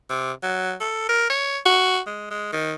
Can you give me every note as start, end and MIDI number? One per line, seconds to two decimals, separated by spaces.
0.10 0.32 48
0.43 0.73 54
0.80 1.05 69
1.09 1.27 70
1.30 1.58 73
1.65 1.99 66
2.07 2.26 56
2.31 2.50 56
2.52 2.74 51